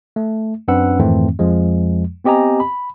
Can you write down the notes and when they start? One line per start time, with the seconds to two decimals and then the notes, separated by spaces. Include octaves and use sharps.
0.16 A3
0.68 F#2 C4 D4 B4 F#5 E6
0.99 F2 G#2 D#3 E3 A3 C4
1.39 F2 F3 G#3
2.24 B3 C4 G4 D#5 G#5 A#5
2.60 B5